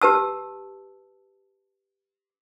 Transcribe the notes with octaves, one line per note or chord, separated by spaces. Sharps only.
G4 B4 A5 E6